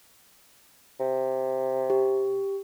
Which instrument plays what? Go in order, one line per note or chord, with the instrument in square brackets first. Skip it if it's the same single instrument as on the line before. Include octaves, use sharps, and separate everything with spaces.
[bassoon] C3
[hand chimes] G4